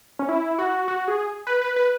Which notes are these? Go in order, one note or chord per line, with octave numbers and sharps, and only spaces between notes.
C#4
E4
F#4
F#4
G#4
B4
B4
B4